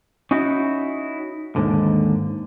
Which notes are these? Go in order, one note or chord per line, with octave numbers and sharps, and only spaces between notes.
C#4 D#4 E4 F#4
D#2 G#2 D3